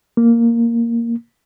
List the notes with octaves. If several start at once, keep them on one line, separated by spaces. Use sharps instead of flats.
A#3